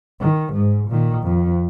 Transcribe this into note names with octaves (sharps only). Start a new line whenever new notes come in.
D#3
G#2
A#2 D#3
F2